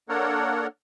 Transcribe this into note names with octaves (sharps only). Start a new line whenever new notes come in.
A#3 D4 A4 A#4 C#5 F#5